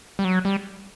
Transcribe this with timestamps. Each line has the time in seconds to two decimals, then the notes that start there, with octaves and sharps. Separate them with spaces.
0.19 G3
0.24 F#3
0.45 G3